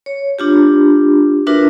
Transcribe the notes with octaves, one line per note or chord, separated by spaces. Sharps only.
C#5
D4 F4 G4
D4 F4 F#4 A#4 B4 E5